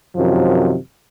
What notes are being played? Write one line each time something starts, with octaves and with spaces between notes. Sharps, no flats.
F#2 C3 D#3 F3